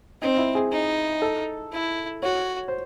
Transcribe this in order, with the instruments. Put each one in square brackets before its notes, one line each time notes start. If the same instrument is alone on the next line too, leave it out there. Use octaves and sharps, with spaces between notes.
[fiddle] C4 [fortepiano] D#4
[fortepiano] E4
G#4
[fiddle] D#4
[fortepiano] A4
[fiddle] E4
[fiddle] F#4 [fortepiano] C#5
[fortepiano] C5